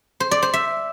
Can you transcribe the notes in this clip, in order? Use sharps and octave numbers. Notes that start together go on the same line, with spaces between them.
C5
D5
C5
E5